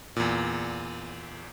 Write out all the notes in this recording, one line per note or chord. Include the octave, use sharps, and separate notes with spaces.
E2 A#2